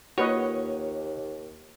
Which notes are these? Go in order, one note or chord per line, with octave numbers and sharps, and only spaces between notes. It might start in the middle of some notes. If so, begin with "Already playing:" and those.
D#2 A#3 F4 F#4 A#4 B4 C#5 D#5